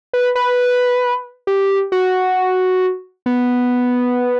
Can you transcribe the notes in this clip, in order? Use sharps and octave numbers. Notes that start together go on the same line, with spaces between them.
B4
B4
G4
F#4
B3